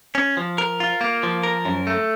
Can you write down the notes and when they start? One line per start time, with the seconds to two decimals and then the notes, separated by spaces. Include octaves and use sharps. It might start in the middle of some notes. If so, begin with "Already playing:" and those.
0.15 C#4
0.37 F3
0.58 A#4
0.80 F4
1.01 A#3
1.23 F3
1.43 A#4
1.65 F#2
1.87 A3